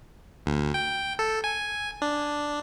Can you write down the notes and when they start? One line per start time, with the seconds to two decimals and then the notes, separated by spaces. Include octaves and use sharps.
0.46 D2
0.74 G5
1.19 A4
1.44 G#5
2.02 D4